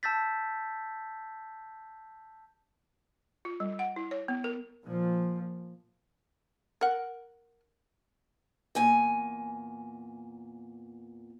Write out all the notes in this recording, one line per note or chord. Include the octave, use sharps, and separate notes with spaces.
A5 E6 G6 A6 B6
F4
G3
F#5
E4
C#5
B3
A#4
A#2 F3
A#4 F#5
E2 A#2 G#5